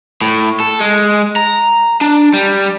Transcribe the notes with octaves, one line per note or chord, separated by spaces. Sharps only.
A2
A4
G#3
A#5
D4
G3